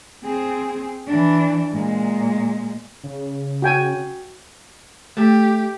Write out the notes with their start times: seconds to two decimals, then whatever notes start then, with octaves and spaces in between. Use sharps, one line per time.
0.24 C4 G#4
1.08 E3 D4
1.72 A#2 G#3
3.04 C#3
3.62 F#4 G5 G#5
5.17 A3 G4